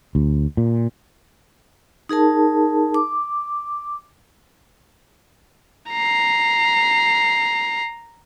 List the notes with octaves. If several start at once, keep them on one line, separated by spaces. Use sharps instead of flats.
D2
A#2
D#4 G#4 A#4 A5
D6
A#5 C7